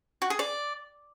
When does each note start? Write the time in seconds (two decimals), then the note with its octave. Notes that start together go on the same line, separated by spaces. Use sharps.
0.22 F#4
0.30 G#4
0.39 D5